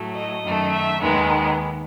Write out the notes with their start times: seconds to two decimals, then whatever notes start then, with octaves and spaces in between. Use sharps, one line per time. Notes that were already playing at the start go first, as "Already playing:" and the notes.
Already playing: A2 F#3 A3
0.15 D#5
0.43 F#2 D#3 A3
0.72 E5
1.00 D#2 D#3 G#3 B3